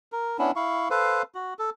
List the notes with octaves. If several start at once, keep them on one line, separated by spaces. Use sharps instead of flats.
A#4
B3 C#4 D4 E4
E4 F5 C#6
A4 B4 C5 F5
F#4
A4